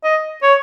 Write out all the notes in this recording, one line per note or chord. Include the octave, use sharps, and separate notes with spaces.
D#5
C#5